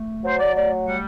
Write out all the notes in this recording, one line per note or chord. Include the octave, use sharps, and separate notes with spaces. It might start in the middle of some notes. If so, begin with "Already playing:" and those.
Already playing: A3
F#3 C5
D5
A3 D5
G3 F#5